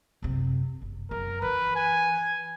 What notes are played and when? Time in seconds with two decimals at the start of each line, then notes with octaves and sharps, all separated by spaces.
0.22 F#2 C3
0.82 F#1
1.11 F#2 A#4
1.42 E3 B4
1.76 G#5